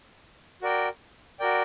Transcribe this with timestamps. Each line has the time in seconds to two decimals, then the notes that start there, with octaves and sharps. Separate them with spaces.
0.62 F#4 A#4 D5 G5
1.40 F#4 A#4 D5 G5